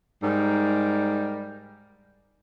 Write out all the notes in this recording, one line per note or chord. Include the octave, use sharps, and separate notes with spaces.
G#2 G3 A#4